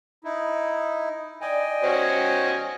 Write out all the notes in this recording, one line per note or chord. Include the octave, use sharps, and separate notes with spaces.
D#4 E4
D5 D#5 F5 G5 G#5
B2 C#4 D#4 F#4 G4 C5